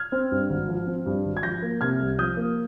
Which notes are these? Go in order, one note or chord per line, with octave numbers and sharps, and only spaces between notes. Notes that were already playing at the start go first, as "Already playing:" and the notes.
Already playing: F6 G#6
C4
G2
G#1
F3
C4
G2
G#1
G#6
F3 G6 A#6
A#3
C3 F6 G#6
C2
F3 D#6 G6
A#3